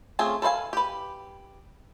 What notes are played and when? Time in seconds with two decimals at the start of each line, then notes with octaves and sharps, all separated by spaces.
0.19 A3 C4 C#4 F4 G#4
0.42 A4 B4 C5 F5 G#5
0.73 G4 B4